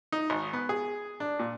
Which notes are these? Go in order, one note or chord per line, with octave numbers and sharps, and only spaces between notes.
D#4
G#1
B3
G#4
D4
A#2